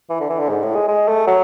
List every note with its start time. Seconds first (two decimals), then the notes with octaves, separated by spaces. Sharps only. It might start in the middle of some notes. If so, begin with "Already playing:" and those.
0.10 E3
0.20 D3
0.29 E3
0.39 D3
0.48 G#2
0.62 A2
0.75 G#3
0.88 G#3
1.08 A3
1.27 F#3